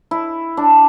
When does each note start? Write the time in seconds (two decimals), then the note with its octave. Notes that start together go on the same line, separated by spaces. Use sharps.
0.11 E4
0.57 D4